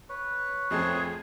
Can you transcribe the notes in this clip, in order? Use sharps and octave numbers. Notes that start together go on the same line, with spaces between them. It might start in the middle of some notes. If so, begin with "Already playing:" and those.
B4 C#5
F2 A3 C4 G#4